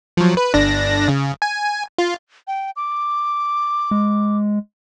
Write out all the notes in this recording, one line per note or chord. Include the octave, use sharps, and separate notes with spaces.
F3 F#3
B4
G1 D4 A#6
C#3
G#5
F4
G5
D6
G#3